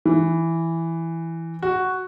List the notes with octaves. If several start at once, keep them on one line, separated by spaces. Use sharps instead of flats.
E3
F#4